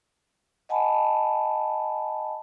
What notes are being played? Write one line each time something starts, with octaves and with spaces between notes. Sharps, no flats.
D#5 F#5 G#5 A5 B5